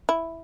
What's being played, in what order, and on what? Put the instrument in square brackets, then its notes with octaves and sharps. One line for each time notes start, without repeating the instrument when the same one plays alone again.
[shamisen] E4